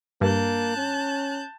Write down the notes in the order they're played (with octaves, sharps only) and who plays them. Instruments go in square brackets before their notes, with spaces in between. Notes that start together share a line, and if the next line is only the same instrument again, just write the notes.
[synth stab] G2 [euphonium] A#3 [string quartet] A5 F#6 G6
[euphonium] C#4